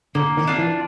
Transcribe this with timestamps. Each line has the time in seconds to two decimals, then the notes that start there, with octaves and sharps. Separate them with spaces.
0.15 D3 A#3
0.37 D#3
0.47 D4 F4
0.58 E3